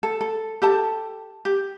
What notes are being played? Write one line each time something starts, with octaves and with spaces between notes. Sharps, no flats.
A4
A4
G4 A4 A5
G4